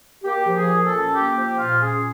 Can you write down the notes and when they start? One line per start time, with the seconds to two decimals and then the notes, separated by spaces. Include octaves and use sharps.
0.24 A#3 G4
0.46 F3
0.53 G#4
0.68 A#2
0.83 A4
0.91 C#4
1.13 A#3 G4
1.36 F3 G4
1.57 A#2 F4
1.80 C#4 G#4